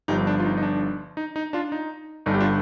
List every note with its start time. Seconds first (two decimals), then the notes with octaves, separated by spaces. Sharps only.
0.08 G1 G2 F3 D#4 G4
0.27 D4
0.40 F4
0.45 D#4
0.58 D#4
0.63 D4
1.17 D#4
1.36 D#4
1.53 D4 F4
1.72 D#4
2.26 G1 G2 D3 G3 D#4
2.34 G4
2.40 D4 F4